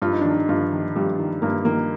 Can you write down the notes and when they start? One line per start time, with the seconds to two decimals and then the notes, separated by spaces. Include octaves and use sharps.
0.02 G2 F4
0.12 D#4
0.21 D#3 D4
0.31 D#4
0.49 G2 F4
0.72 D#3
0.95 G2 G3
1.19 D#3
1.42 G2 A#3
1.65 D#3 A#3